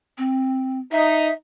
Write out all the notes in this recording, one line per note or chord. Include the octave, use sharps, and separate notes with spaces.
C4
D#4 E5